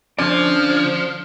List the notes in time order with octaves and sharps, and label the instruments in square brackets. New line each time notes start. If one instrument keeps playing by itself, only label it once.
[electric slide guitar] D3 C#4 D5 [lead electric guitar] F3